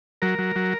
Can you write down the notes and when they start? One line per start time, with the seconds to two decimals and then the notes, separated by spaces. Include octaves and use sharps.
0.22 F#3 A#4
0.39 F#3
0.56 F#3